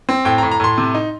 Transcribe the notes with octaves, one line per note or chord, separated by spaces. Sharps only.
C4
A2 G5
A#5
A2
A#5
A2 C6
C3
D#4